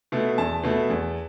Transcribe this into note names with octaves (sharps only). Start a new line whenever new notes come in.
B2 A3
E2 A5
B2 A3
E2